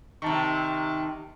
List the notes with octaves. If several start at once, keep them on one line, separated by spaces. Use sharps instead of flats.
C3 D#3 A5 C#6